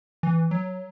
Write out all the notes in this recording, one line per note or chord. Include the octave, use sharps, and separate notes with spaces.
E3
F#3